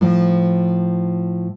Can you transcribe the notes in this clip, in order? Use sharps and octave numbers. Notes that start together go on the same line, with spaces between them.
A2 F3